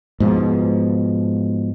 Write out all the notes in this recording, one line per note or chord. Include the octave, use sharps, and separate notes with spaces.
G#2 B2 F3